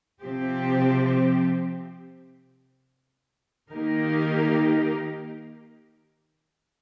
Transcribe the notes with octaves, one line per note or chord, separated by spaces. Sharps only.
C3 F3 C4 G4
D#3 A#3 D#4 G4 A#4